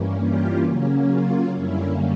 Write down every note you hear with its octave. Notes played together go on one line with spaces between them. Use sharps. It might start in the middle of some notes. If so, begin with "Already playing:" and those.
Already playing: G2 E3 G3 A#3 C#4
F4 G4
C#3 F#3 A#3 C#4
F4
F#2 D3 G3 A#3 C#4 E4